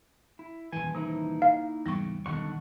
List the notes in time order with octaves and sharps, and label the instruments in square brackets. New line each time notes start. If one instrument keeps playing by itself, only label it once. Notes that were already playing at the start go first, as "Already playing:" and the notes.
[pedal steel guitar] E4
[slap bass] D#1 E3 [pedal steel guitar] G#5
[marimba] C3 [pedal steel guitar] A#3 D#4 E4
[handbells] F5
[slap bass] E2 G#2 C#3 [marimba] G3 C#6
[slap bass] D#1 B1 D3 [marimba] D#3 [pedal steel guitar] D4 F#5 C#6